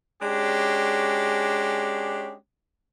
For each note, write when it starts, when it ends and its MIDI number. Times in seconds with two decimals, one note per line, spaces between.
0.22 2.35 56
0.22 2.35 61
0.22 2.35 62
0.22 2.35 66
0.22 2.35 67